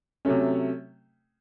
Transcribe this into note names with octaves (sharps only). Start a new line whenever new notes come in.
C3 F#3 A3 C#4